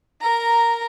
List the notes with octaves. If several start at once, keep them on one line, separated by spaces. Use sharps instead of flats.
A#4 A#5